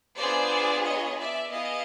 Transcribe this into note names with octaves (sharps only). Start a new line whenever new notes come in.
B3 D4 F4 G#4 C5 D5
C#5 D#5
D5 E5
B3 E4 G#4 D#5 F5